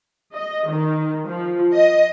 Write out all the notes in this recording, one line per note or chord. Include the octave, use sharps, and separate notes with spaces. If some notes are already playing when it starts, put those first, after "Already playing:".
D#5
D#3
F3
D#5